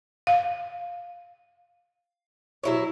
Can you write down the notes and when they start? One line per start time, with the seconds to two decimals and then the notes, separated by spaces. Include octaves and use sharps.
0.27 F5
2.63 F#3 E4 C#5